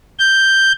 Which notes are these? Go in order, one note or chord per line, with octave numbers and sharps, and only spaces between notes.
G6